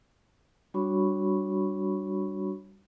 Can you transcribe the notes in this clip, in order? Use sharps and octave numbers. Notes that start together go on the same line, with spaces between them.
G3 D4 F#4 C#5 B5 C#6